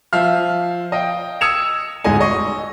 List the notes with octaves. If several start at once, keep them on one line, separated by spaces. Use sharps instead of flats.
F3 E5 F5 F6
D#5 F5 G5
D#6 E6 G#6 C#7 E7 F7
D1 G#2 G#4 D#5 G#5
D#5 C#6